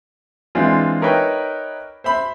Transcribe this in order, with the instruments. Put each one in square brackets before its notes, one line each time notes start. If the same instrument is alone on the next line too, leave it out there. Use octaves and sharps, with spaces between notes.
[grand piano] E3 G#3 C4 D4 F4
D#4 A#4 B4 C#5 E5 G5
C5 E5 B5